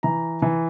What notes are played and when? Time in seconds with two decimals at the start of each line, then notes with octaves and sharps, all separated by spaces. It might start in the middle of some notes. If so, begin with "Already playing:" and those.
0.03 E3 A#5
0.42 E3